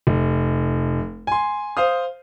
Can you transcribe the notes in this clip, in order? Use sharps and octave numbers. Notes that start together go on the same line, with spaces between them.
F1
G#5 C6
C5 F5 D#6